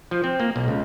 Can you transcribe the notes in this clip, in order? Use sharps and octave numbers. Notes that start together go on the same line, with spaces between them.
F3
C4
A#3
B1
C#2